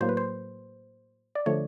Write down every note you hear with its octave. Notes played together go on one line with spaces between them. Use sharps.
A2 F#3 A#3 C5
B4
C5
D5
D3 F3 A3 C#5